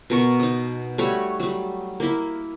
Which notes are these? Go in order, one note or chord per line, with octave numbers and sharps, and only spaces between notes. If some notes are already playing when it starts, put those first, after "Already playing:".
B2 A#4 C#6
D#4 D#5
G3 A3 F#4 C#5
F#3 G3
A#3 E4